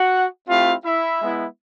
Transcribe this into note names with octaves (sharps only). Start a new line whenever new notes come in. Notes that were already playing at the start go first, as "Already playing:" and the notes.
Already playing: F#4 F#5
A3 C4 E4 F4 G4 F5
E4 E5
G#3 B3 E4